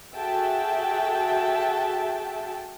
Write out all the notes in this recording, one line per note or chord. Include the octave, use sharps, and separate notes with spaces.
F#4 G#4 A4 E5 G5 A5